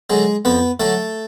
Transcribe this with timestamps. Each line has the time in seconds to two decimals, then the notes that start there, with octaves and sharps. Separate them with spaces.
0.10 D3 F#3 G#3 G#4
0.45 F2 B3 B4
0.80 D3 F#3 A3 A4